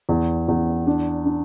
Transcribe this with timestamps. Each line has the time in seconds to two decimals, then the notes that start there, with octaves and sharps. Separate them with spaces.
0.09 E2
0.48 E2
0.87 D4
1.25 D4